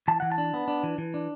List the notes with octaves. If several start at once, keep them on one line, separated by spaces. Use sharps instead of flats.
E3 A5
E3 F#5
A5
D4
B3
D4
E3
E3
D4